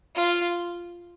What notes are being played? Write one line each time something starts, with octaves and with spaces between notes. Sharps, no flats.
F4